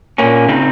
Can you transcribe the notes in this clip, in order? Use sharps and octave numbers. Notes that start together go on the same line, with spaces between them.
A#2 A#3 C#4
C#3 C4 D#4